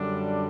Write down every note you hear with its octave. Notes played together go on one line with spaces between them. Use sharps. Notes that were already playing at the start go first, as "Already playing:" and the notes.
Already playing: F#2 D3 G3 D4